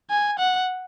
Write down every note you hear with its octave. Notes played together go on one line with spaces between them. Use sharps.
G#5
F#5